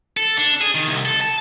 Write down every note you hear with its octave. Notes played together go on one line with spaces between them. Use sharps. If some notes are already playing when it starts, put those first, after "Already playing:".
A4
D4
G#4
D#3
C2
A4
A5